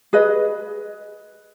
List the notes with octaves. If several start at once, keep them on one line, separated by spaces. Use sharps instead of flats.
G#4 B4 D#5